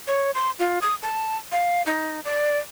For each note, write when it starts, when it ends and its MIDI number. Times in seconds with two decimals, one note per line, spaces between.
0.08 0.31 73
0.35 0.51 84
0.59 0.79 65
0.82 0.95 87
1.02 1.37 81
1.52 1.82 77
1.86 2.20 63
2.25 2.57 74